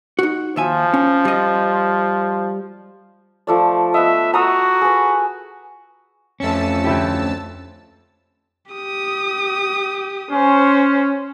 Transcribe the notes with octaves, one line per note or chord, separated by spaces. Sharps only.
D#4 F#4
D#2 F3 E5 G#5
C#4
G3 D#5
F3 A3 D5
B3 D#5 E5
F#4 A#5 D#6 E6
G#4 B4
F2 A3 C#4 A5 E6
D2 E4 G4
G4 D#6
C#4 C5